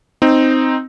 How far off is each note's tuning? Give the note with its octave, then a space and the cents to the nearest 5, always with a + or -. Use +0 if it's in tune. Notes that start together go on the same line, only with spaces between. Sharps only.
C4 +0 D#4 +0